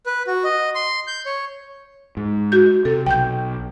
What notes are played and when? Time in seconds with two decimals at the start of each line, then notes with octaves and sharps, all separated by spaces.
0.06 B4
0.27 F#4
0.44 D#5
0.75 C6
1.07 G6
1.26 C#5
2.17 G#2
2.52 F#4 G6
2.85 C3 A4
3.07 B1 G5 G6